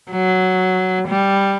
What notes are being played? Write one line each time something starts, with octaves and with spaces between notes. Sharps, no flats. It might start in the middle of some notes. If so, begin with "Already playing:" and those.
F#3
G3